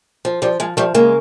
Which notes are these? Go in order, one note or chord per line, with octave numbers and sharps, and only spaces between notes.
F3
F3 G3
F3 G#3
F3 G3 A3
C#3 G#3 A#3